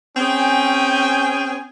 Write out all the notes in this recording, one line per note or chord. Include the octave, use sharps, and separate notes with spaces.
C4 C#4 G#4 G5 G#5